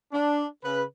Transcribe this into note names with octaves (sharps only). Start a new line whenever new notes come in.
D4
C#3 B4